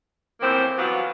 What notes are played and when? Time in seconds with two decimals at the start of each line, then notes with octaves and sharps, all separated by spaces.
0.41 F#2 A2 F3 A#3 C4
0.77 E3 F#3 G3 B3 F4